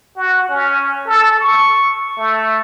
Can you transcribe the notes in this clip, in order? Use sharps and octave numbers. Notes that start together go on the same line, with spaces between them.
F#4
C#4
A4
C#6
A3